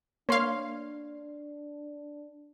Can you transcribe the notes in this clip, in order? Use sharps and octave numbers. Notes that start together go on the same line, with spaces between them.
A#3 D4 C#5 F5 C6